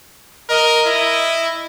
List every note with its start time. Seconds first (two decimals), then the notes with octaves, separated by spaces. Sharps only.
0.49 A#4 D#5
0.86 E4